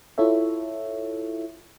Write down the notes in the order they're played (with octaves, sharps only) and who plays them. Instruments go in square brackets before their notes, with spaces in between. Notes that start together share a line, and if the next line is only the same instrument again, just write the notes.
[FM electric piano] E4 F4 A4 C#5 E5